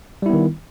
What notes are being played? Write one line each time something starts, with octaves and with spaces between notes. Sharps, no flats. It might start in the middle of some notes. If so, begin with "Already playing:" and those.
D#3 G3 B3 E4